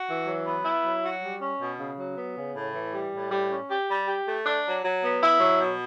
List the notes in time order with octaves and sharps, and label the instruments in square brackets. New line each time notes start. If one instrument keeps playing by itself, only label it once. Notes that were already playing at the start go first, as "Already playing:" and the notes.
Already playing: [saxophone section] F#4
E3
F#3
B3
E4
F#3
F#4
G3
C#4
B2
C#3
F#3
B3
C#3
A2
E3
G3
A2
G3
C#4
G4
G3
G4
A3
D4
F#3
F#3
B3
E4
F#3
B2